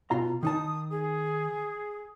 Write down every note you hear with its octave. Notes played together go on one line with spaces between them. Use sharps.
B2 F4 A#5
D#3 D#4 A5 D#6
G#4